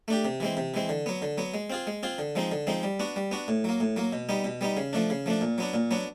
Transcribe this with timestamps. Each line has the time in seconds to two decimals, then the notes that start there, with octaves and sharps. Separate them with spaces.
0.08 A3 D4 G4
0.25 C3
0.40 E3 G#3 C4
0.57 C3
0.74 E3 G#3 C4
0.89 D3
1.06 F#3 B3
1.22 D3
1.38 F#3 B3
1.54 G#3
1.70 C4 F4 G#4
1.87 G#3
2.03 C4 F4 G#4
2.18 D3
2.35 F3 G#3 C4 D#4
2.51 D3
2.67 F3 G#3 C4 D#4
2.83 G3
3.00 B3 D4 F#4
3.16 G3
3.31 B3 D4 F#4
3.48 A2
3.64 F#3 A#3
3.81 A2
3.96 F#3 A#3
4.13 B2
4.29 G3 B3 D#4
4.45 B2
4.61 G3 B3 D#4
4.77 C#3
4.93 F3 A3 D4
5.10 C#3
5.26 F3 A3 D4
5.41 A#2
5.58 F#3 B3 D4
5.74 A#2
5.91 F#3 B3 D4